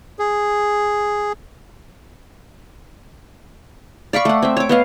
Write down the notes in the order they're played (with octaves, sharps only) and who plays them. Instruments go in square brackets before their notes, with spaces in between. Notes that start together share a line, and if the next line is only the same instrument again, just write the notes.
[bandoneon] G#4
[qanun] D5 F5 B5 C#6
A3 F#5
C4 E5
C#5 D6
B3 D#5 F5